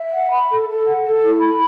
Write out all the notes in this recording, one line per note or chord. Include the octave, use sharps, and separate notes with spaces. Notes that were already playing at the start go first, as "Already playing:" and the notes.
Already playing: E5
F#5
B5
A4
A4
F#5
A4
E4
B5